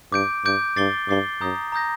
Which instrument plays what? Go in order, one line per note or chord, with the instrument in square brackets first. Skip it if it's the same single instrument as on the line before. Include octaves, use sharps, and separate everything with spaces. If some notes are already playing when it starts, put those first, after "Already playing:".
[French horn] G2 [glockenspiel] D6 G6 D7
[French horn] G2 [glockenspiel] D6 G6 D7
[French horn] G2 [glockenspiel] D6 A6 C7 G7
[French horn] G2 [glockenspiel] D6 A6 C7 G7
[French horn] F#2 [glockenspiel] A#5 D#6 G6 A#6
[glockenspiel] A#5 D#6 G6 A#6